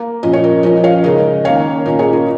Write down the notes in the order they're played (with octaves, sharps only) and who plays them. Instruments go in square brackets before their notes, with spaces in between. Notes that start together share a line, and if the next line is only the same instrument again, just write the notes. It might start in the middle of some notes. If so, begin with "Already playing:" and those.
Already playing: [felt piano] A#3
A#2 F3 C#4 D#5
C#5
A#4 D#5
F3 C#4 A#4 D#5
C#5 F5
C#3 G#3 D#4 A#4 D#5
D#3 A#3 C#4 C#5 F5
A#2 A#3 C#4 A#4 D#5
G#4 C#5
F4 A#4